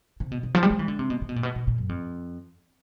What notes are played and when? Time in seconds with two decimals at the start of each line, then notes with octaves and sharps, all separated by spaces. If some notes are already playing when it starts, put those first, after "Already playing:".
0.20 C3
0.32 B2
0.43 C3
0.55 F3
0.63 G3
0.71 G#3
0.79 E3
0.88 D3
0.99 C3
1.10 B2
1.22 C3
1.29 B2
1.36 A#2
1.43 B2
1.56 B2
1.67 A#2
1.78 F#2
1.89 F2